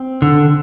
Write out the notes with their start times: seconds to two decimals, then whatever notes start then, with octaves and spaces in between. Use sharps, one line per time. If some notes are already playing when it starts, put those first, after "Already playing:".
Already playing: C4
0.22 D3